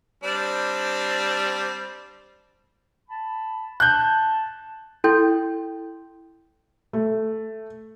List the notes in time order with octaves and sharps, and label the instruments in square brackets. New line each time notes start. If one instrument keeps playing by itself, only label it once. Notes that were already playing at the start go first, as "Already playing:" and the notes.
[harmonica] G3 C4 D4
[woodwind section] A5 B5
[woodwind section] A5 [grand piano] F#6 G6
[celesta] E4 A4 G5 C6 G6
[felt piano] A3